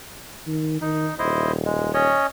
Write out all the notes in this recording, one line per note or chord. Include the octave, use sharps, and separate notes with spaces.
D#3
D#3 D#4
D#1 E4 C5 D#5
G#3
C#4 C#5 D#5